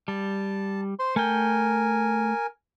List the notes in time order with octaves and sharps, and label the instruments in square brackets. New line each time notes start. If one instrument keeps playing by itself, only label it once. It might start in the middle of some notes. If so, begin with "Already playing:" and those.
[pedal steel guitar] G3 [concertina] A5
[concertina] C5 C6
[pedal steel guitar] A3 G5 [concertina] A#4 G#5